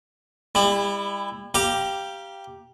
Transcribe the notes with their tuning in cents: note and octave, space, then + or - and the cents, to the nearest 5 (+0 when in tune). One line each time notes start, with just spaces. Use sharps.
G3 +40 E4 +0
G4 +0 F5 -20 A#5 +30